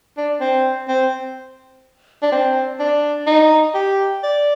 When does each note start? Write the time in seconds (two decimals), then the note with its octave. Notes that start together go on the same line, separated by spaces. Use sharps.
0.17 D4
0.41 C4
0.88 C4
2.23 D4
2.32 C4
2.80 D4
3.27 D#4
3.75 G4
4.23 D5